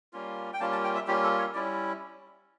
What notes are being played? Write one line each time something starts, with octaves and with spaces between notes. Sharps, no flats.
G3 A#3 C#4 F4
G5
G3 A#3 C#4 F4 A5
A5
G5
E5
G3 A#3 C#4 F4 G4
A4
C#5
G3 C#4 E4 D5